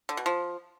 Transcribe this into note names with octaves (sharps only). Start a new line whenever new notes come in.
D3
B2
F3